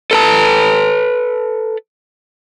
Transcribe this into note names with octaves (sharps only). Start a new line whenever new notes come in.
A4 B4 A5